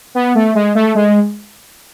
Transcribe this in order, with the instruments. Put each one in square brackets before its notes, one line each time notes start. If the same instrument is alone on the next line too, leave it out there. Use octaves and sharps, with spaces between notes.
[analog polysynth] B3
A3
G#3
A3
G#3